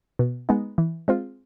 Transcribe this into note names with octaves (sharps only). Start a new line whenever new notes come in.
B2
G#3 B3 D#4
E3
G#3 C4 F4